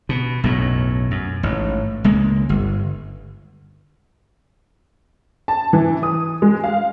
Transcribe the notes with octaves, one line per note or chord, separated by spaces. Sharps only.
B2
B1 F#2 A2
F#2
A1 G#2
C#2 G#3 A#3
G1
A5
E3
D#6
G#3
F5